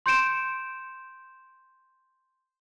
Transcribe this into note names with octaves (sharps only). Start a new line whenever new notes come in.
C6 G6 C#7 D7 E7